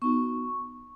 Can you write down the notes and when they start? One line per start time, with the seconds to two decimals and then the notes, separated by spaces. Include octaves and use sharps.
0.02 B3 D#4 F#4 C#6